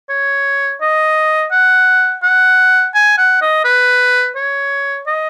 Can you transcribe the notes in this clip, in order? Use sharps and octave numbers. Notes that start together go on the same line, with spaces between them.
C#5
D#5
F#5
F#5
G#5
F#5
D#5
B4
C#5
D#5